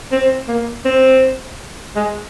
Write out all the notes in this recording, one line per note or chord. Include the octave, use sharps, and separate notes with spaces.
C4
A#3
C4
G#3